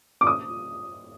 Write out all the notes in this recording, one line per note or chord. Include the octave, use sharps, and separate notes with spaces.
D6
D#6